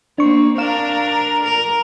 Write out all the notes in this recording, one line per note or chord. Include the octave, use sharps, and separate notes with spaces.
A#3 C4 D4 C#6
D4 A#4 F5 E7
A#4